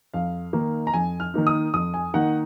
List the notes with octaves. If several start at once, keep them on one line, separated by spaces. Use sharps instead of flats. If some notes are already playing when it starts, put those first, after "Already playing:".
F2 F5
D#3 A#3 D#4
A#5
F2 G#5
F6
D#3 A#3 D#4
D#6
F2 D#6
G#5
D#3 A#3 D#4 F#5